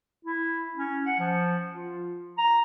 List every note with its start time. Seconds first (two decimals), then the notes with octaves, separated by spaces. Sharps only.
0.25 E4
0.76 C#4
1.06 F#5
1.19 F3
1.72 F4
2.38 A#5